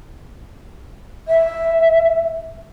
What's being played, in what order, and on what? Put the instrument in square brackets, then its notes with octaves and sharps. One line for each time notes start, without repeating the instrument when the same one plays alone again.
[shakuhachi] E5